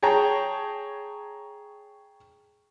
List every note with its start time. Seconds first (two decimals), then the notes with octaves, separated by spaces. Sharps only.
0.03 G#4 C#5 G5 A5 A#5